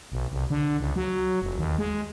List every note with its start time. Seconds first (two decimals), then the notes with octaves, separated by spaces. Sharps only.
0.12 B1
0.32 C2
0.50 D3
0.80 C#2
0.96 F#3
1.42 F1
1.58 D#2
1.79 G#3